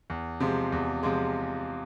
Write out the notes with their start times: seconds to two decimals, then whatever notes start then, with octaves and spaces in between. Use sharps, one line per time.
0.10 E2
0.40 C3 F3 G#3
0.72 E2
1.03 C3 F3 G#3